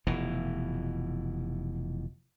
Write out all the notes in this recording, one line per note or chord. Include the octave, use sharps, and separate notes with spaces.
F1 B2 E3